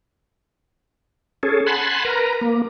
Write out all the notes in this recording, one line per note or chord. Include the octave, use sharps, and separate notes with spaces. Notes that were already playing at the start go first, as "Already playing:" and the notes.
C#4 G#4 A4
F#5 G#5 A5 B5 C6
A#4 B4 A#5
A#3